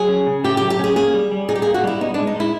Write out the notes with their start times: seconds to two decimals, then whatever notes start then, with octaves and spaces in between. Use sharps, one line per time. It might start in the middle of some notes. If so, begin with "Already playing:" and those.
Already playing: F#3 G#4
0.09 C#4
0.27 C#3
0.44 A3 G4
0.57 G4
0.62 F#3
0.70 G4
0.79 C#4 G#4
0.96 A#3 G#4
1.14 G3
1.32 G3
1.49 D#4 G#4
1.56 G4
1.62 A#3 G#4
1.74 F#4
1.84 G3 E4
2.01 B3 D#4
2.14 G#3 D4
2.27 D#4
2.36 G#3 E4